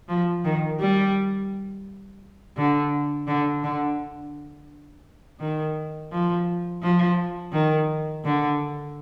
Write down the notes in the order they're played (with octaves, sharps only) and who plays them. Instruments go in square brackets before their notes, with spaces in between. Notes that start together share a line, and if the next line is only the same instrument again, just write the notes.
[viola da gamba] F3
D#3
G3
D3
D3
D3
D#3
F3
F3
D#3
D3